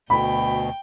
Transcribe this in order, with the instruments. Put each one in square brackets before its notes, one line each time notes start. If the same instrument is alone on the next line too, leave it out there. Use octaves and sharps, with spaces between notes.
[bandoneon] D2 B2 [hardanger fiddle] G5 [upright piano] B5